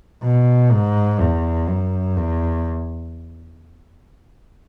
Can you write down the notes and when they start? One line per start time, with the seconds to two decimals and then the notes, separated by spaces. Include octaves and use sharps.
0.24 B2
0.72 G#2
1.20 E2
1.68 F#2
2.17 E2